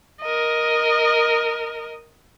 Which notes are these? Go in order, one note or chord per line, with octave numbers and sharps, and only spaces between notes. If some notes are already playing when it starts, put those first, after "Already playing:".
A#4 D#5